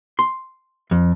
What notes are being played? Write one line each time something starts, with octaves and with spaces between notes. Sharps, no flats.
C6
F2